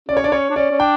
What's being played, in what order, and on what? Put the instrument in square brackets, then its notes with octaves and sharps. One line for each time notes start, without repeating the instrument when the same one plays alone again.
[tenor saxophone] C#4 [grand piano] D5
[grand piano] C#5
[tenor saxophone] D4 [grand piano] D5
[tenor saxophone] C#4 [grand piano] C#5
[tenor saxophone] D4
[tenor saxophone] C#4 [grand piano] D5
[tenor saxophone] C#4
[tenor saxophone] D4 [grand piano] G5